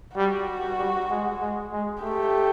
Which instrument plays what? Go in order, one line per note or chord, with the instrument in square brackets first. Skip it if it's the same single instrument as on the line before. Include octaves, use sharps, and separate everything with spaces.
[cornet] G3 [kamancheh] F#4
[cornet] G3
G#3
G#3
G#3
[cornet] A3 [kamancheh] G4